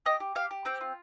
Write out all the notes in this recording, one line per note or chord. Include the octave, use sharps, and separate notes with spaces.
G4 D#5
G4
G4 F5
G4
C4 G5
F4